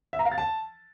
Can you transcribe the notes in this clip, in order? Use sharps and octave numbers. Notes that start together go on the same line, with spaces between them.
E5
A#5
F5
A6
A5